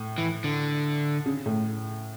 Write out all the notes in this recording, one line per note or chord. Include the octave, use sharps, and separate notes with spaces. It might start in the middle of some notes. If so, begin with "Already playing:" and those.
Already playing: A2
E3
D3
C#3
A2